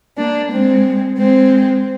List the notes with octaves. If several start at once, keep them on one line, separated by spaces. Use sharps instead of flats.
A#3 D4
G#3 C4
G#3 C4